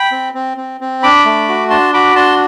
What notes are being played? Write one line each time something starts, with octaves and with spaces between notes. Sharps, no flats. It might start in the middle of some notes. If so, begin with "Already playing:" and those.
Already playing: G5 B5
C4
C4
C4
C4
D4 B5 D6
A3
F#4
D4 A5 C6
F#4 B5 D6
D4 A5 C6